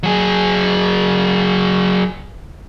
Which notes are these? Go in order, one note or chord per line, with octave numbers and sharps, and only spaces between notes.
F#3 G#4